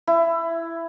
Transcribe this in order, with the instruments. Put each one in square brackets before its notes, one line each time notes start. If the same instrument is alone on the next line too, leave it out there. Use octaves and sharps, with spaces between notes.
[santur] E4